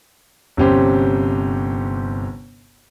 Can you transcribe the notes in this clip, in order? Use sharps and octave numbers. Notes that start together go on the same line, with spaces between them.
G1 C3 C#4 G4 C5